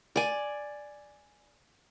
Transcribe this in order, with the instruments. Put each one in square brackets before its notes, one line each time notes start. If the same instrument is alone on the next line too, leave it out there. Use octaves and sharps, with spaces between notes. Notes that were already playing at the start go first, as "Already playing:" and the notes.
[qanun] D5 G#5